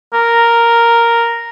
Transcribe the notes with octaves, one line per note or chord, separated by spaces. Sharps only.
A#4